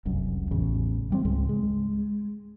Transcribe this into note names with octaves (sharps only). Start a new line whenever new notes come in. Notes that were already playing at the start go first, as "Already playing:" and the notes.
F1 C2 F#2
A1 E2 C#3
E3 G3 C4
C#2 G#2 G#3
G#3